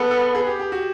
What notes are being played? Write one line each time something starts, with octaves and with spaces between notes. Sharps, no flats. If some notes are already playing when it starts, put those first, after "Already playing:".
Already playing: B3 G#4 A4 B4
A4
G#4
G4
G4
F#4